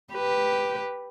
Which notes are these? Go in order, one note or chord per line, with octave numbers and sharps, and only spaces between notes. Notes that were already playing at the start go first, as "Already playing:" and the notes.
G4 B4